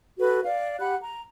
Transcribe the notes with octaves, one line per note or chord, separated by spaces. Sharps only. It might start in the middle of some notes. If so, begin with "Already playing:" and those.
F#4 A4 B4
D5 F5
G4 F#5 B5 F#6
A#5